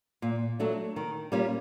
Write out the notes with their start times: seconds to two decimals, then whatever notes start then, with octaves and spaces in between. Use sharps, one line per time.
0.22 A#2
0.59 F#3 A3 D4
0.96 D#3
1.32 G3 A#3 C#4 F4